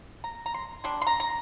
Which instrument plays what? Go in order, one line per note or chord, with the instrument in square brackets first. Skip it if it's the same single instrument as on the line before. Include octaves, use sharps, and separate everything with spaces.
[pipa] A#5
A#5
C6
G3 D4 C6
C6
A#5
A#5